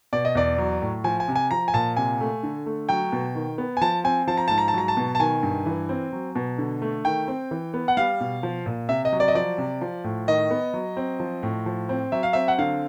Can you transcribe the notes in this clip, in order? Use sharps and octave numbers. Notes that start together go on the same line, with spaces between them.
B2 D5
D#5
E2 D5
F#3
A2
F3 G#5
G#5
C3
G#5
F3 A#5
G#5
A#2 A5
C3 G#5
A3
D3
A3
F#3 G5
B2
D#3
B3
G#5
F3 A5
C4 G#5
F3 A5
A#5
G#2 A5
A#5
A5
F#3 A#5
A5
B2
A5
D#3 G#5
G2
E3
C4
F#3
B2
D3
A3
D#3 G5
C4
E3
B3
F#5
G3 F5
B2
F3
A#2
C3 E5
D#5
F#3
D5
D#5
F3 D5
C3
F3
A2
D#3 D#5
B3
F#3
C4
F3
A2
F3
C4
F#3 E5
F5
C4 E5
F#5
D3 F5